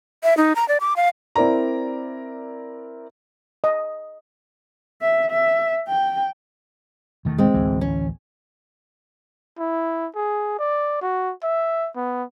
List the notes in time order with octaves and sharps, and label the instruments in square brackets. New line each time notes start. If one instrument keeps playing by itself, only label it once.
[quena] E5
D#4
A#5
D5
D6
F5
[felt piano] C4 E4 A#4 D5 A#5
[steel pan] D#5
[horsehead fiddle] E5
E5
G5
[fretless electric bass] E1 D#3 A3
[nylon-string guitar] G#3 C4
[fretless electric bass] A1 D2 E3
[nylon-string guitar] C#4
[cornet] E4
G#4
D5
F#4
E5
B3